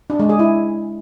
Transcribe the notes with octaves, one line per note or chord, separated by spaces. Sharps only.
D4
G#3
G#4
E4